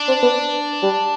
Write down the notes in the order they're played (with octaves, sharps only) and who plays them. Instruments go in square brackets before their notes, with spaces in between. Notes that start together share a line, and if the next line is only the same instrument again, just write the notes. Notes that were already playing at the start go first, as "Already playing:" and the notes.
Already playing: [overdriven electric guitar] D4
[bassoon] C4
B3
G3